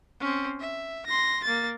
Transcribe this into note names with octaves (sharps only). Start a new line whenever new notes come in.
C4 C#4
E5
C6 A#6
A#3 A6